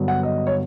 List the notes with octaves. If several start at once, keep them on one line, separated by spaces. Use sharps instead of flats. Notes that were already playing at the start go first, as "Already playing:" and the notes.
Already playing: G2 D3 F#3 B3
F#5
D#5
C#5